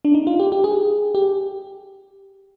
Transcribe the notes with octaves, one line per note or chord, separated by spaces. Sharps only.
D4
D#4
F4
G4
G4
G#4
G4